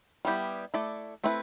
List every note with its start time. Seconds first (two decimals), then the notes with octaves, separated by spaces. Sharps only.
0.25 G3 B3 E4 G4
0.74 A3 E4 A4 D5
1.24 A3 C4 E4 B4